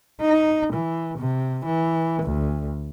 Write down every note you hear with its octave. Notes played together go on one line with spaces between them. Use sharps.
D#4
E3
C3
E3
D2